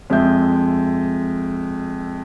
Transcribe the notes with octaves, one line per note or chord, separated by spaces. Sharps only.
F2 G#3 E5 G6